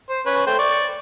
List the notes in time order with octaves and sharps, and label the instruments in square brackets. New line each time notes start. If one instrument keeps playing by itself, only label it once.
[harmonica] C5
C#4 B4 C#5
A3 C5 G5
D5 C#6